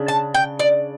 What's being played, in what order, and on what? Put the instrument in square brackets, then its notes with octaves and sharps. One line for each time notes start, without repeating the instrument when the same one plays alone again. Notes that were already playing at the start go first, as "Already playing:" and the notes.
Already playing: [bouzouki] C#3 D4
A5
G5
D5